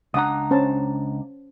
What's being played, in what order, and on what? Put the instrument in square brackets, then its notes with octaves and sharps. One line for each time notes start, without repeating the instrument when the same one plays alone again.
[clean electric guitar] C#2 D4 A#5 [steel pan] F#5 D#6
[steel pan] C#4 C5 A5